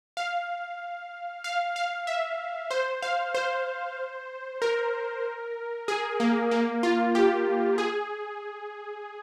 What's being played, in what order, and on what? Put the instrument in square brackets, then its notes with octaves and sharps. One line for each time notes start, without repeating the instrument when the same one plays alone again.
[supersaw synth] F5
F5
F5
E5
C5
F5
C5
A#4
G#4
A#3
A#3
F4
G4
G#4